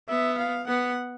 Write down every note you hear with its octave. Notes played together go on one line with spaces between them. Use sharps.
B3 E5
F5
B3 F#5